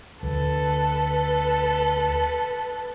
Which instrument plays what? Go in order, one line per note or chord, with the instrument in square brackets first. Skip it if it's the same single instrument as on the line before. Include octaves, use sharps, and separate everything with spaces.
[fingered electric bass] D2 D3 [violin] A4 B4